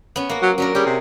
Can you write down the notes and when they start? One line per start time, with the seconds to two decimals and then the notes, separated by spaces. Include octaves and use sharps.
0.16 B3 C#4
0.30 A#3 F#4
0.42 F#3
0.58 F#3 C#4 D4 A#4
0.75 G3 C#4 G#4
0.86 C3